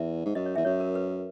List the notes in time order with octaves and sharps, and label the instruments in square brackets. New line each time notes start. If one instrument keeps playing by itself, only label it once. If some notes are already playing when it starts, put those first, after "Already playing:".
Already playing: [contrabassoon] E2 [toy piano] E5
[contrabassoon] G#2
[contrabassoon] F#2 [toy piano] D#5
[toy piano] C#5
[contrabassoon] E2 [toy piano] E5
[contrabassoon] F#2 [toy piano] C#5
[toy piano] A#4
B4